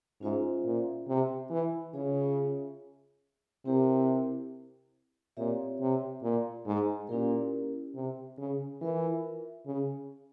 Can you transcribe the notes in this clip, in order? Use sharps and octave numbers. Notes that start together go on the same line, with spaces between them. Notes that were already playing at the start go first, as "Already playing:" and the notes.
G#2 C#4 F4 C5 E5
A#2
C3
E3
C#3 F4 G#4 C#5 E5
C3 C4 E4 G4 A#4
A#2 C4 G4 C#5 E5
C3
A#2
G#2
A#2 C#4 E4 G4 A#4
C3
C#3
E3 F4 A#4 E5
C#3